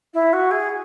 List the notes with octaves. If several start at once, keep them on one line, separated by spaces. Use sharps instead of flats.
E4
F#4
G#4